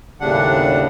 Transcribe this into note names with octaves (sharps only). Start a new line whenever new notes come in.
D#2 A2 C#3 G3 D4 F#5